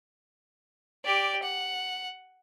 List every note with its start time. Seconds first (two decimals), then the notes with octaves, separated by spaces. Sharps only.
1.05 G4 D5
1.43 F#5